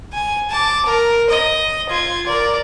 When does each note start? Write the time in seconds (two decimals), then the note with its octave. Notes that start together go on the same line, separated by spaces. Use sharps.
0.13 G#5
0.50 A5 D6
0.86 A#4
1.30 D#5
1.90 F4 G#6
2.27 A#4 D5